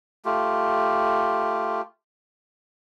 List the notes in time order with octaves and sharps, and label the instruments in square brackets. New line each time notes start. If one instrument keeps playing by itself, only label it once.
[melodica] A3 F4 G4